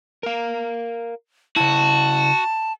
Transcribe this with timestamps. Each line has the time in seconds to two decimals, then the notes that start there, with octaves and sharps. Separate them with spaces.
0.23 A#4 F5
1.56 C#3 E4 F#4 A5